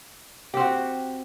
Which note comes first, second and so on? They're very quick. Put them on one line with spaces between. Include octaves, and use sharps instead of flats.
G4 C4 F#4